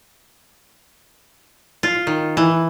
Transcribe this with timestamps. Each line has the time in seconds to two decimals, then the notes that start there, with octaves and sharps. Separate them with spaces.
1.83 F4
2.07 D#3
2.37 E3